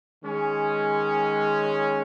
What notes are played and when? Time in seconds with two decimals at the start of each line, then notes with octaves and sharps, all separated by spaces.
0.23 D#3 G#3 C#4